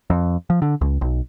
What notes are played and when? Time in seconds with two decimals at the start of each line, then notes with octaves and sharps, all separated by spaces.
0.10 F2
0.50 F3
0.62 D3
0.81 C#2
1.01 B1